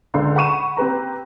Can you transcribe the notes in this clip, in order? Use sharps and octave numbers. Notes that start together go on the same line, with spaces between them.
C#2 D3 C6
F#5 B5 C#6 D#7 E7
C4 G4 B4 A#5